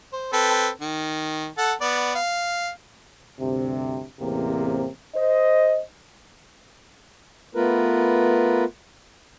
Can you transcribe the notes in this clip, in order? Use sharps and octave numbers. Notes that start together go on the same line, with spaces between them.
C5
C4 A4 B4
D#3
A4 F#5 A5
B3 D5
F5
D2 G2 C3
A1 E2 C3 A#3 C4
C5 D#5
A3 B3 F4 A#4 B4